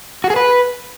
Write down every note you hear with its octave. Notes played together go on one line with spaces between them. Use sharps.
F#4
G#4
B4